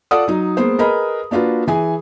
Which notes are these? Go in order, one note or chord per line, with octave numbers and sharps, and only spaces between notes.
F4 A4 D5 F#5 D#6
F#3 D#4
G#3 A#3 B3 C5
G#4 A#4 B4 D#5 B5
A#3 D4 F4 F#4 B4
E3 G#4 G#5